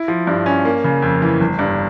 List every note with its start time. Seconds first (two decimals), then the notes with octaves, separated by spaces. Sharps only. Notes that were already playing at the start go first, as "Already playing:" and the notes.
Already playing: E4
0.08 F3
0.27 G2
0.46 C#4
0.65 A#3
0.84 C#3
1.02 F2
1.22 E3
1.41 G1
1.59 G2